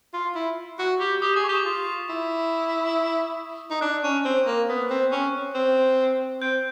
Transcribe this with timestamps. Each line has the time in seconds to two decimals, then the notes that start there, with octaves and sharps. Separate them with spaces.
0.13 F4
0.35 E4
0.79 F#4
1.00 G4
1.22 G4 D#6
1.33 G#4 D6
1.44 G4 C#6
1.55 D6
1.65 F4
2.09 E4
3.71 D#4
3.81 D4 F#6
4.04 C#4
4.25 C4
4.46 A#3
4.69 B3
4.90 C4
5.12 C#4
5.54 C4
6.41 C4 G6